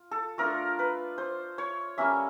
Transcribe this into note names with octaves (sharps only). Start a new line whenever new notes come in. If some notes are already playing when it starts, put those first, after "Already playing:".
Already playing: F4
A4
A3 D4 F4 A#4
B4
C5
C#5
G3 A#3 C#4 E5